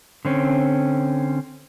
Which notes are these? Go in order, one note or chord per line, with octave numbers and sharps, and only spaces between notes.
D3 C4 C#4